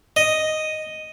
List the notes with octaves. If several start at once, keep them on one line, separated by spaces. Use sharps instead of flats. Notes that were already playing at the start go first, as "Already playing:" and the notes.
D#5